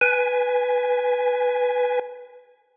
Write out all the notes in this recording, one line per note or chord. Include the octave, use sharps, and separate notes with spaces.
B4 G#5